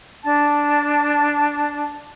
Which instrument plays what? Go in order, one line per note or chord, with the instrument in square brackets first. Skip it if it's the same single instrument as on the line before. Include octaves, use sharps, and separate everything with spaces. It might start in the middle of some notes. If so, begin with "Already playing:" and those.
[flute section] D4 A5